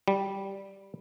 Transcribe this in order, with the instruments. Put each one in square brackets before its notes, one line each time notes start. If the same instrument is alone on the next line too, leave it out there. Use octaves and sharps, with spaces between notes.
[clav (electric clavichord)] G3